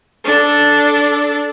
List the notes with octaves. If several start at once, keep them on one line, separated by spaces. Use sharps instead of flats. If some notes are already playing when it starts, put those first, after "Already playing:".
D4 A4